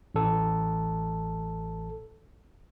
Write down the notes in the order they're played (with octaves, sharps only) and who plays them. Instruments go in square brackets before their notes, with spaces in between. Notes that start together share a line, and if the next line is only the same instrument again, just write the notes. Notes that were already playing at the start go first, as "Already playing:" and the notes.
[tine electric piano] A1 A4